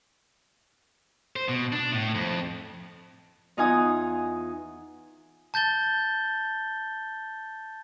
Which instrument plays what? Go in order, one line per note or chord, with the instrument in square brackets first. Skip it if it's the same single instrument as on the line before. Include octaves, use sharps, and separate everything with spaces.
[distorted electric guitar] C5
B2
D4
A2
F2
[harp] E2 D#4 F4 F#5 G#5 D#6
[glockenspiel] A5 G6 A6 G7